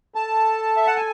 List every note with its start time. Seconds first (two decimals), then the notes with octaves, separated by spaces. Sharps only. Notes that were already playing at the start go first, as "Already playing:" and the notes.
0.15 A4 A5
0.77 E5
0.87 F#5
0.96 G#5